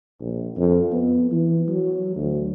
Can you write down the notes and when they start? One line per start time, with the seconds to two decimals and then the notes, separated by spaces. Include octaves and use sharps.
0.21 A#1
0.56 F2
0.92 B3
1.31 E3
1.68 F#3
2.16 D2